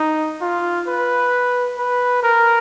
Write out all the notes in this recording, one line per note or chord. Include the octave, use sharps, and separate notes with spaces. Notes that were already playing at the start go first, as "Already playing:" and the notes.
Already playing: D#4
F4
B4
B4
A#4